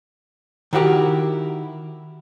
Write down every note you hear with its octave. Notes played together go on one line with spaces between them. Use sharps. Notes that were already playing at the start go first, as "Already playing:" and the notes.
D#3 E4 F#4 G4 A#4